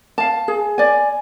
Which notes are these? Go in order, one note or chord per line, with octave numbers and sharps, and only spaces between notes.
F5 A5
G#4
D5 G#5